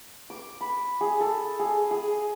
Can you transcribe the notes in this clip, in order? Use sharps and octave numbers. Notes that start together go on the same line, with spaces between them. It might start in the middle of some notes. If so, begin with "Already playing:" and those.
D6
B5
G#4
A4
G#4
G#4